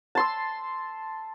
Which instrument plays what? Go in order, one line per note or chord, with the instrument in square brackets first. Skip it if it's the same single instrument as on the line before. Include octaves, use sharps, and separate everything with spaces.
[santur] A5 C6 E6